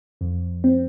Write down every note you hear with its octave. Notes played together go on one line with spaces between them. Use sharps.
F2
C4